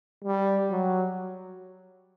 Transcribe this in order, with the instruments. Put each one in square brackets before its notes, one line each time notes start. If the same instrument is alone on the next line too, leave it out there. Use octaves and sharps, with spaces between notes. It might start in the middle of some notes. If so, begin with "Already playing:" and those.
[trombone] G3
F#3